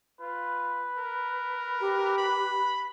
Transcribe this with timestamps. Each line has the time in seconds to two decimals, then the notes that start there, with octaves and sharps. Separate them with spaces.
0.20 F4 B4
0.98 A#4
1.80 G4
2.18 B5